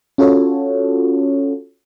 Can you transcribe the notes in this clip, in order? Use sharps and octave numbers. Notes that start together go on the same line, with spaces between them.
C#4 F4 F#4 A4 C#5